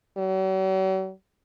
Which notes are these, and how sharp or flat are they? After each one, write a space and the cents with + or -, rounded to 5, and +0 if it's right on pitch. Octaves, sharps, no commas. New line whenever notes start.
F#3 +45